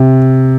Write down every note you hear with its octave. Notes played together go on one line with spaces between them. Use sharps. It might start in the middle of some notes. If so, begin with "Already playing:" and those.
Already playing: C3